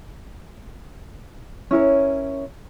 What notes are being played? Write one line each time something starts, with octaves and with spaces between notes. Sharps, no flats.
C#4 E4 A#4 C#5